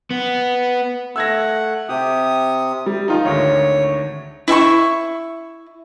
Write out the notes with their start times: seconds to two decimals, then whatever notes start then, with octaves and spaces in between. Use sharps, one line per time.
0.11 B3
1.16 A3 F#5 E6 G#6 A#6
1.89 C3 G4 D#6
2.86 G3
3.08 D#3 F3 D#4 F4
3.25 G#1 D2 C#5
4.48 E4 E5 G#5 C#6